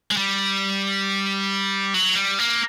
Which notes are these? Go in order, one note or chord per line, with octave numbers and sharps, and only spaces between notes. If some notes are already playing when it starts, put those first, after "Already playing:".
G#3
G3
F#3
G3
A#3